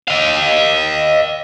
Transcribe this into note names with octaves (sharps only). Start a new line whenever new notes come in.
D#5 F5